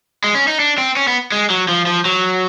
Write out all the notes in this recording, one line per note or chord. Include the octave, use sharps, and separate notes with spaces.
G#3
C#4
D#4
D4
C4
C#4
B3
G#3
F#3
F3
F3
F#3